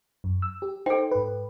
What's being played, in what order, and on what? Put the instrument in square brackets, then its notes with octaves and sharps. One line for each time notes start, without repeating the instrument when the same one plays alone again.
[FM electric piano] F#2
E6
G4
[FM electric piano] D#4 C5 [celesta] A4 G5
[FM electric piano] G#2 B4